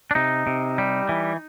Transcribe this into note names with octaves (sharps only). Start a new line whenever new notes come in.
D4
C3 D#4
C3
G3
E3